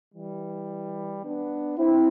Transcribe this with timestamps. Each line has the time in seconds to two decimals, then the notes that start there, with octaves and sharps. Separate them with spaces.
0.13 E3 G3
1.23 B3 D4
1.78 C4 E4